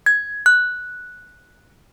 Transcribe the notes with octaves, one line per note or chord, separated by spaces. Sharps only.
G#6
F#6